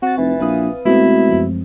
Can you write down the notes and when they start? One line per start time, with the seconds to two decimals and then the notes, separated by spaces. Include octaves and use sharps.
0.02 C4 F#4 A6
0.18 F1 E3
0.40 A#1 B4 F5 D#6
0.85 B2 G#3 A3 C4 E4
1.29 F#2 F3